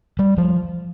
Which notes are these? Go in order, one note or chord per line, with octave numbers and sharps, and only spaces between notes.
G3
F3